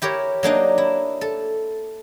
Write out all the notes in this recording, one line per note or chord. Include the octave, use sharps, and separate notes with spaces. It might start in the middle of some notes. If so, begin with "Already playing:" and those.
E4 G4 A#4 C#5
F#3 A#3 D4 D#4
E4
A4